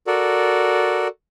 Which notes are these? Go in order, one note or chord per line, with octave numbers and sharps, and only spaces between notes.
F#4 A4 A#4 D5